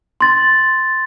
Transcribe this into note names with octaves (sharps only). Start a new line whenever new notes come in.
C6 A6